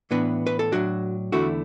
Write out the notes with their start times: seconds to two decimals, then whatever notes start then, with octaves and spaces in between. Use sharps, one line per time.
0.11 A2 E3 B3 D4 B4
0.47 B4
0.59 A4
0.72 A2 F#3 D4 F#4
1.32 E2 D3 A3 E4 F#4